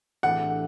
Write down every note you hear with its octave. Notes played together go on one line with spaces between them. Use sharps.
A2 E3 A3 D4 G4 F#5